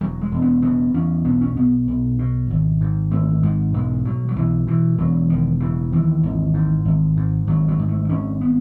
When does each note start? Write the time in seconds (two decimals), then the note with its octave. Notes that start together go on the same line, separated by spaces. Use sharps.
0.01 E1 F#3
0.21 G#3
0.32 E1
0.42 B3
0.62 C#3 B3
0.94 E2 C#4
1.25 B1 B3
1.41 C#4
1.57 B2 B3
1.88 B1
2.19 B2
2.50 G#1
2.81 G#2
3.11 G#1 A3
3.43 G#2 G#3
3.74 B1 G#3
4.05 B2 F#3
4.28 F#3
4.36 B1 E3
4.67 B2 E3
4.98 E1 F#3
5.29 E1 D#3
5.60 C#3 E3
5.92 D#2 E3
6.23 G#1
6.54 G#2
6.85 G#1
7.17 G#2
7.47 G#1 F#3
7.68 F#3
7.79 G#2
7.89 A3
8.10 G#1 C#4
8.41 B3